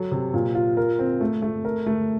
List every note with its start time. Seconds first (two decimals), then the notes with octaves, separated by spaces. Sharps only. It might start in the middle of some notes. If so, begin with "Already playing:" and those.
Already playing: F#3 A4
0.12 C3
0.34 A#2
0.55 F4
0.77 A#4
0.99 C4
1.21 A3
1.42 A3
1.65 A#4
1.86 A3